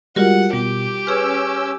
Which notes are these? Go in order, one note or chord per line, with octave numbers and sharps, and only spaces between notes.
G3 G#3 F4 F#4 A#4 F#5
B2 G3 G4
C#4 G#4 B4 C#6 E6 F6